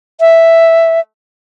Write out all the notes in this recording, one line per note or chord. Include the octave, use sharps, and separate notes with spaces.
E5